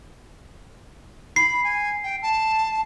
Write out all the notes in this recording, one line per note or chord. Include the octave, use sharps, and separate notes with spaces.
B5 C7
G#5
G5
A5